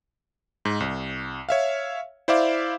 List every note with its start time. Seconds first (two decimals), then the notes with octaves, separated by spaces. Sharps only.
0.65 G#2
0.80 C2
1.49 C#5 E5 F5
2.28 E4 C5 D5 E5 F5 D6